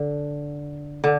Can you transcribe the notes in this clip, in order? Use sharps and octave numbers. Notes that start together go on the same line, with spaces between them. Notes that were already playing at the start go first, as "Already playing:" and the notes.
Already playing: D3
D3